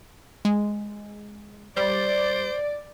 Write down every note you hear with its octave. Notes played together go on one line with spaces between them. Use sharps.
G#3
G3 C5 D5